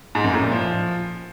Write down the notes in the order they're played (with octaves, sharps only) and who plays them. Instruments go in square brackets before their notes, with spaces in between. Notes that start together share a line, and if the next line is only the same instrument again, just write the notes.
[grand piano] G#2
F#2
A2
A#2
F3